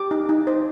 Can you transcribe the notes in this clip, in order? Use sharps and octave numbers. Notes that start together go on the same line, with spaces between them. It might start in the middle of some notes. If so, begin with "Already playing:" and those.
Already playing: G4 D6
D#4
D#4
C5